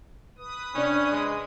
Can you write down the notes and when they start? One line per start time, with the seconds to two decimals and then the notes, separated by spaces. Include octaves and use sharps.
0.38 B4 D#6
0.74 C3 C#4 D4 D5
1.11 G#3